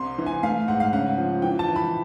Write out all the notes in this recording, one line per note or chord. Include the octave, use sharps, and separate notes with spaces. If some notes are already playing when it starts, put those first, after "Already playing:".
Already playing: C2 C3 C6
E3
G#5
A3 F5
G#2 F#5
F5
C#3 F#5
F3
E3 G5
A5
E3
B5